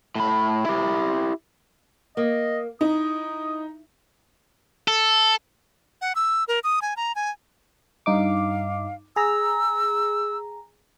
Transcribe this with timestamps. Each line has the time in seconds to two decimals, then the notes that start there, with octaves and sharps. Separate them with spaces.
0.15 A2 B5
0.66 E4 G4
2.17 A#3 D#5
2.81 D#4 E4 D#6
4.88 A4
6.01 F#5
6.16 E6
6.48 A#4
6.64 D#6
6.82 G#5
6.97 A#5
7.15 G#5
8.06 G2 D#4 F5 D6
9.16 G#4 A#5 E6